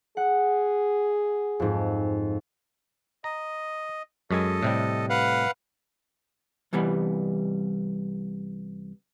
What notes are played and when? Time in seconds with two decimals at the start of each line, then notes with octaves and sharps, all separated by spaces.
0.17 G#4 F#5
1.60 F2 G#2
3.24 D#5 A#5
4.31 F#2 G#3 A4 D#5 G#5
4.63 A2 C3 G3
5.10 B4 F5 F#5
6.73 C2 E3 G3 B3